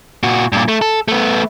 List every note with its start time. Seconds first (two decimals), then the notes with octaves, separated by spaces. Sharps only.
0.23 A#2 F#4
0.52 G2 A#2
0.68 A3
0.82 A4
1.08 A3 B3